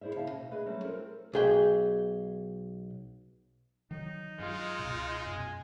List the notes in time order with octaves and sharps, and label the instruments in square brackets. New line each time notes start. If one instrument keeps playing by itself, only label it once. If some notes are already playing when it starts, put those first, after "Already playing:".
[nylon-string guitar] E4 G#4 C5 D5 E5
D#2 C#3 E5 F5 A5
B2
A3 D4 G#4 B4 D#5 E5
F#3 G3 A3 C4 C#4
F4 A4 A#4 C5
[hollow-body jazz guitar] B1 G#4 G5
[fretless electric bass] D#3 F#3 [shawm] D#4
[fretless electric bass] G2 F#3 [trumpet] G#3 [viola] F4
[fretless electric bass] C#2 B2
[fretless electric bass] F#2 B2 [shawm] G#5